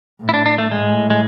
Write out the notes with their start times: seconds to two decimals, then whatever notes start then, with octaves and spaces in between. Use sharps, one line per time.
0.21 A2
0.29 E4
0.34 D4
0.46 D4
0.58 A3
0.71 A2 G#3
1.10 G#3